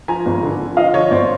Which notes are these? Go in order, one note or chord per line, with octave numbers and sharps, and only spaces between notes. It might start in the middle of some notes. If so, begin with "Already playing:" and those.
F3 G#5 A#5
G#1
D3
F3
F3 D#5 F5
D3 C#5 D#5
G#1 C5 D5